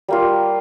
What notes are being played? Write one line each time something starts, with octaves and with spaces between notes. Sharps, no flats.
G3 A#3 F4